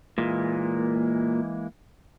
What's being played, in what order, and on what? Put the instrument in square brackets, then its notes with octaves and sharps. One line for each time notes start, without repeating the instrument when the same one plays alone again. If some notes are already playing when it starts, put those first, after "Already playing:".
[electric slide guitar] A#2 [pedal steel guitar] E3 G#3 A#3